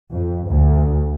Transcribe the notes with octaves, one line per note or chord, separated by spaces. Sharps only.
F2
D2